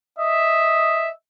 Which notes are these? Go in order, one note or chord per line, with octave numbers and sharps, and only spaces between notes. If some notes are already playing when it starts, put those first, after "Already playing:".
D#5 E5